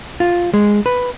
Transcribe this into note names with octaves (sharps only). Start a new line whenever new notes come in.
F4
G#3
B4